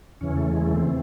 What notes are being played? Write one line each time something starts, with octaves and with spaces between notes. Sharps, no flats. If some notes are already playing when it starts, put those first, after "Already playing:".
E2 C#3 E3 C#4
A3
G#3
A3
C4
E3